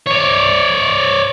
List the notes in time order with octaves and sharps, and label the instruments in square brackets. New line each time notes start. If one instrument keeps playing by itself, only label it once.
[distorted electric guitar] C#5 D5